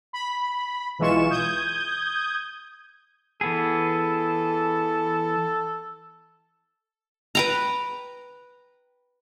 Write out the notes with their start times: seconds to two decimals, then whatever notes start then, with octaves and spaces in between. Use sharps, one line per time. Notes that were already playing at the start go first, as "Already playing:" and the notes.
0.13 B5
0.98 B1 E3 G#3 F4 C#6 E7
1.31 D#6 G6 G#6
3.41 E3 B3 G#4 A4
7.35 B4 G5 A#5